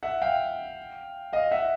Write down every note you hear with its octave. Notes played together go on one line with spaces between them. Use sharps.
E5 F#5
F5 G5
D#5 F5
E5 F#5